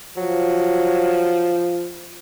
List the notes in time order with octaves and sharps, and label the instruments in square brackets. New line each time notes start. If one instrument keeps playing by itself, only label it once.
[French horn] F3 [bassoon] F#3